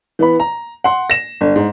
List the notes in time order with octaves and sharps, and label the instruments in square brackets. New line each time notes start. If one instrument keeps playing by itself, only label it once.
[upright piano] E3 B3 B5
A#5
F#5 C6
A#6 E7
G1
G#2